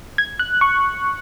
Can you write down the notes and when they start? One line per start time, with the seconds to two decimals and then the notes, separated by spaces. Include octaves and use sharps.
0.18 G#6
0.39 F#6
0.61 C#6